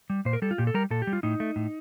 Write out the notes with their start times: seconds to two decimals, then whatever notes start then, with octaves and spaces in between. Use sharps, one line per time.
0.10 G3
0.25 A#2 C5
0.33 A#4
0.42 G3 A4
0.51 F4
0.58 A#2 G4
0.67 A4
0.74 G3 A#4
0.90 A#2 A4
1.02 G4
1.07 G3
1.13 F4
1.23 A2 D#4
1.40 A3
1.56 A2